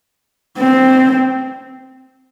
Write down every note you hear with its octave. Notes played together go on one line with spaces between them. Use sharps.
C4